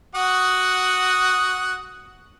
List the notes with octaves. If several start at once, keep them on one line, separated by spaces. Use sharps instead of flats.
F#4 F#5 D#6